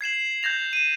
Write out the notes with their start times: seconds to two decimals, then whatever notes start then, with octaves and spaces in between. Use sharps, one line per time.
0.01 G#6 C7 E7 F#7
0.43 G6 G#6 A#6 F7
0.73 D#7 E7